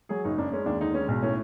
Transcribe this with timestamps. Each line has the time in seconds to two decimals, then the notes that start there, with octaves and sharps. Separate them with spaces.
0.09 F#3 G#4
0.24 F#1 D#4
0.38 F#2 D4
0.53 G#3 C#4
0.66 D#2 D4
0.81 D3 D#4
0.94 G#3 C#4
1.08 B1
1.22 A2 C#4